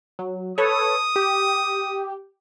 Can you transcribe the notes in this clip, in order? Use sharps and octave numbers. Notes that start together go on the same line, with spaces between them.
F#3
A4 B4 C#5 D#6
G4